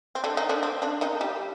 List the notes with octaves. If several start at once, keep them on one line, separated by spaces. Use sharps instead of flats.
C4
D3 D4
D#3 D#4
D3 D4
C4
D3 D4
D#3 D#4
G3 G4